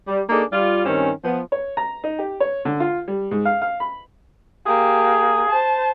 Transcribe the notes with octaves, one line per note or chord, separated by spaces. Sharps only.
G3
A#3 D4 D#4 G#4 A4
G3 F4
G2 D#3 C4 C#4
F3 B3
C#5
A#5
D#4
G4
C#5
D3
F4
G3
G#2
F5
F5
B5
A#3 G4 G#4
C5 A5